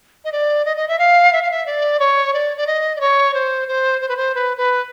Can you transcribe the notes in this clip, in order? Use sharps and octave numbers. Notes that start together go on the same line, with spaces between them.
D#5
D5
D#5
D#5
E5
F5
E5
F5
E5
D5
C#5
D5
D5
D#5
D5
C#5
C5
C5
C5
B4
C5
B4
B4